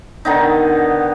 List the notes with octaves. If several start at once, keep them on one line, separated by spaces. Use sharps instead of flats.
D3 D#3 B3 D#4